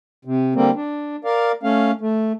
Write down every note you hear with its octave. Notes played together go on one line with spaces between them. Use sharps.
C3
D3 G3 A#3 C4
D4
A#4 D5 F5
A3 C#4 F5
A3